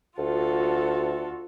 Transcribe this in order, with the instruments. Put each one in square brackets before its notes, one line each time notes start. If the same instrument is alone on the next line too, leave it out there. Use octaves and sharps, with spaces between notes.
[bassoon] D2 [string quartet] F4 F#4 A4